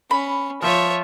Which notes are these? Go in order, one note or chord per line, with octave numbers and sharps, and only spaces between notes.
C#4 B5
F3 F4 C#5 E5